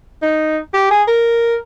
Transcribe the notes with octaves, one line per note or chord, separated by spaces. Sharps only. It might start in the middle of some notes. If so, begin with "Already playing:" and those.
D#4
G4
G#4
A#4